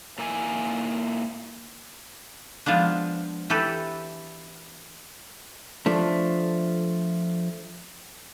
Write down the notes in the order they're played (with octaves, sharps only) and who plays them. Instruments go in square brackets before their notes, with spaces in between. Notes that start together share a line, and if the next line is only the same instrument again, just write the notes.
[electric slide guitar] A#2 A#3 D#4 E4 C5 G#5
[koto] F3 G#3 B3 D4
E3 G4 A4 B4
[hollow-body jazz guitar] F3 A3 D4